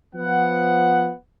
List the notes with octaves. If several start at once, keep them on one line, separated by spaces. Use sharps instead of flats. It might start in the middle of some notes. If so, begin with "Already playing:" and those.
F3 B3 F#5